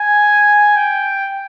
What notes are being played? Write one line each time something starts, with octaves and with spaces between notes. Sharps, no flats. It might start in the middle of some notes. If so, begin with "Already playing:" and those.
Already playing: G#5
G5